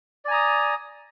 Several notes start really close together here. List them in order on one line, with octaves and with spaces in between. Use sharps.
D5 G#5 A#5 D#6